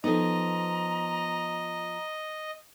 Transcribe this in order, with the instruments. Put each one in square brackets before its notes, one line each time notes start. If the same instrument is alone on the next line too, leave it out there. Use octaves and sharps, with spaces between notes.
[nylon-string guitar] F3 B3 [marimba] D#4 A4 [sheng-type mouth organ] D#5 [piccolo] A#5